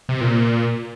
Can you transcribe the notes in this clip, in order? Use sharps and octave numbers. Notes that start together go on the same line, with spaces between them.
C3
A#2